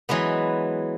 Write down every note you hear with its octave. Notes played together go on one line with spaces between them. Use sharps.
E3 F#3 G#3 B3